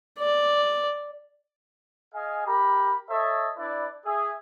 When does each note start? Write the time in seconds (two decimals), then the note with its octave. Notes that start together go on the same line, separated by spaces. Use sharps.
0.19 D5
2.14 G#4 D#5 F5 G#5
2.46 G4 A#4 A#5 B5
3.09 A4 C#5 D#5 E5 A5
3.57 D4 E4 B4 D5
4.05 G#4 E5